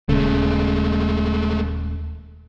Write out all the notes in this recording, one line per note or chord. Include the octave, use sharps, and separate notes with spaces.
D#1 C#3 G#3 A3